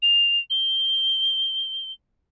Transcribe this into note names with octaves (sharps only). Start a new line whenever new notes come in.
F7
G7